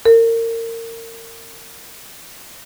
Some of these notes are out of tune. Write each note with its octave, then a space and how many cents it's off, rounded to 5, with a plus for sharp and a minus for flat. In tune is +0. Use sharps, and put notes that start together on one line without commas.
A#4 -30